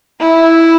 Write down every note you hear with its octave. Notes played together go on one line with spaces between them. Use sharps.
E4